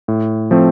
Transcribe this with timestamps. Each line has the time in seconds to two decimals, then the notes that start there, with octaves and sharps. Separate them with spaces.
0.08 A2
0.51 F3 A3 C4